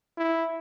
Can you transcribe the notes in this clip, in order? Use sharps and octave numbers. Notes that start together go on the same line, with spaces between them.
E4